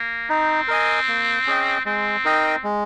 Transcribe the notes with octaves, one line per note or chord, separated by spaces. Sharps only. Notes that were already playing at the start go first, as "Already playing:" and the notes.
Already playing: A#3
C4 D#4
A#4 D#5 G#5
A#3
C#4 G#4 D#5 G5
G#3 C4
D#4 A#4 D#5 G5
G#3